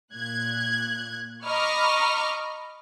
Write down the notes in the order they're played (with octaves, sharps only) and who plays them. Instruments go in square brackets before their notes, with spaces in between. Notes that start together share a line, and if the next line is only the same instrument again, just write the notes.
[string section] A#2 F#6 G#6
D#5 A#5 B5 C#6 D6 F6